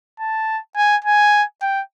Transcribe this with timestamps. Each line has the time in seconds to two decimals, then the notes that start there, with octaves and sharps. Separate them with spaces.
0.20 A5
0.77 G#5
1.04 G#5
1.62 G5